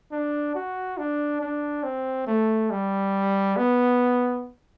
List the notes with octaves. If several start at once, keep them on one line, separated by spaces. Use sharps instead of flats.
D4
F#4
D4
D4
C4
A3
G3
B3